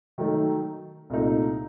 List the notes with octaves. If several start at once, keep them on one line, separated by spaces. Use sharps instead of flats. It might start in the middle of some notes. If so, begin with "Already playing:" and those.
D#3 F#3 A3 D#4
C2 A#2 A3 D#4